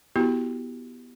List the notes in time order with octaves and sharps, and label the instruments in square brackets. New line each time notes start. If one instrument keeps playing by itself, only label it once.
[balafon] B3 E4 F#4 G4